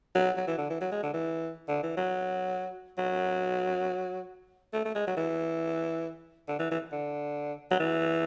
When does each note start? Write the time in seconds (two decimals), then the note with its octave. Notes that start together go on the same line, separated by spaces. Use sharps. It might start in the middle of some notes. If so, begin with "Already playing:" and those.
0.15 F#3
0.37 F#3
0.47 E3
0.58 D3
0.69 E3
0.81 F#3
0.92 G#3
1.03 D3
1.13 E3
1.68 D3
1.83 E3
1.97 F#3
2.98 F#3
4.73 A3
4.85 A3
4.95 G#3
5.07 F#3
5.17 E3
6.48 D3
6.59 E3
6.71 E3
6.92 D3
7.71 F#3
7.79 E3